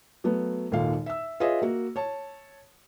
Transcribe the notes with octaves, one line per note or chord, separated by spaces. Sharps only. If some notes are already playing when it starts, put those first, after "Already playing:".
F#3 A3 B3
G#1 D#2 A#2 A4 F5
E5 E6
F4 G#4 B4 C#5 D#5 E5
A#3 F#4
C#5 A5